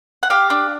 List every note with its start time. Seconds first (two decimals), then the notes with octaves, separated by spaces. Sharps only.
0.23 F#5
0.30 G4 F5
0.50 D4